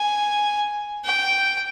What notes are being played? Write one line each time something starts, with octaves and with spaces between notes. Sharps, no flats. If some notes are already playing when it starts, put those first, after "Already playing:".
Already playing: G#5
G5